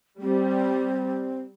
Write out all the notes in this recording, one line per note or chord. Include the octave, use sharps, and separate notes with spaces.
G3 C4